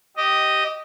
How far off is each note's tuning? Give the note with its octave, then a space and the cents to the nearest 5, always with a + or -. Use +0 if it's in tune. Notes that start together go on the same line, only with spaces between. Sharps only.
G4 -15 D#5 +0